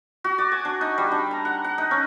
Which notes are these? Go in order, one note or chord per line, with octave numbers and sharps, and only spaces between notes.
F#4
D5
G#5
D4
D#4
G3
D4
A#5
F#5
F#5
D#4
C#4